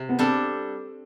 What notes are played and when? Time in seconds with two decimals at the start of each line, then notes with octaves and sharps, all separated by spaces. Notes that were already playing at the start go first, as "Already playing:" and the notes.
Already playing: C3
0.09 B3
0.18 G3 C4 D4 A4